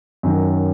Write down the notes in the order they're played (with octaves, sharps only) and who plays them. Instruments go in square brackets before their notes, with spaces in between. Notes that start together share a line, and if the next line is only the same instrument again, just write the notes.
[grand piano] F#2 D#3 F#3